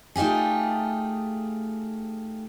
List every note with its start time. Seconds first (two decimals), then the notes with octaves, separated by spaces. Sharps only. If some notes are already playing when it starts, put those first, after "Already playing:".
0.16 A3 D#4 F4 G4 G#4